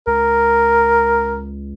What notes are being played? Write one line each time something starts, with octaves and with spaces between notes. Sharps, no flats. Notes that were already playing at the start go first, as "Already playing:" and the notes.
C#2 A#4